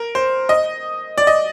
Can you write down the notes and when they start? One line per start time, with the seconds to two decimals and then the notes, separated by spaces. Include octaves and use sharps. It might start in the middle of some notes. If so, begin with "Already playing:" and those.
Already playing: A#4
0.15 C5
0.49 D#5
1.18 D5
1.27 D#5